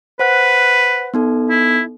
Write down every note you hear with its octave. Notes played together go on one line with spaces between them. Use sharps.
B4 C5 F#5 F#6
B3 D#4 A4
E4